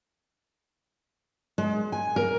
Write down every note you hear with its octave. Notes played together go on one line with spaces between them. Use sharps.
G#3
G#5
A#4